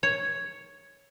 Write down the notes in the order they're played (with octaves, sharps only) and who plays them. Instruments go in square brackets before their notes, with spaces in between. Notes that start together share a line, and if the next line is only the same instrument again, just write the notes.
[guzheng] C#5